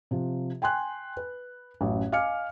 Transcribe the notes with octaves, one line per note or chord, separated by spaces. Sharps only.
C3 F3
G5 G#5 C6 F#6
B4
A1 F#2
D#5 F5 G#5 D6 F6 C#7